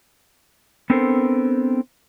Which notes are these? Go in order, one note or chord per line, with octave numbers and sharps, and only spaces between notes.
B3 C4 D4 A4 A#4 C5